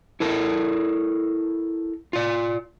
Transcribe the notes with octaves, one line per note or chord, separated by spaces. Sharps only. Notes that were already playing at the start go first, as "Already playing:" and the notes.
E4 A4 A#4 A5
F4 D5